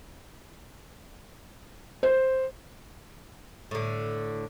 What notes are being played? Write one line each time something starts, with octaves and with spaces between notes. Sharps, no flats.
C5
A2 D3